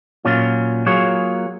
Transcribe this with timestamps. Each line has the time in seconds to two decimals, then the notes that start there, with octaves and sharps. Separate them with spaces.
0.25 A#2 F#3 C#4 F4
0.86 F#3 A#3 F4 G#4 C#5